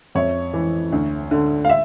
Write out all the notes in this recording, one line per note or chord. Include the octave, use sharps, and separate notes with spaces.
F2 C#5 E5
E3
D2
D3
F5
E5